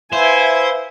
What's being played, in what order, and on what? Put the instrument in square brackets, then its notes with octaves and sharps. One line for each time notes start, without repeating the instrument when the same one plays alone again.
[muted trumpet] E4 [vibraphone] B4 E5 F5 [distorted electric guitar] C5 [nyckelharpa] G#5